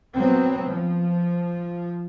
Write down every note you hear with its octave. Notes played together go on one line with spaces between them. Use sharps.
F#3 B3 C4
F3